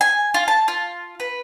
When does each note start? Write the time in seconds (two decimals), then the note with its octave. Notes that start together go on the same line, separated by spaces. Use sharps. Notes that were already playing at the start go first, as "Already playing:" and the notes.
0.01 G#5
0.34 F4
0.48 A5
0.68 F4
1.20 B4